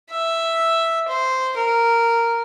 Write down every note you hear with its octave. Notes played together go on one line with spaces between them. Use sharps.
E5
C5
A#4